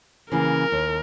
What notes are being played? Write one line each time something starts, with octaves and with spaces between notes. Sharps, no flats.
C#3 E3 A#3 A#4
D#2